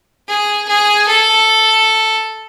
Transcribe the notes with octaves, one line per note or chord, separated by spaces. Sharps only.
G#4
G#4
A4